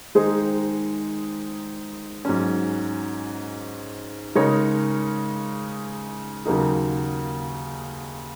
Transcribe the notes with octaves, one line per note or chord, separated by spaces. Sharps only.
D#3 G#3 D#4 G#4 C5
G#2 F#3 C#4
C#3 G#3 D#4 A#4 C#5
D#2 C#3 F#3 A#3 D#4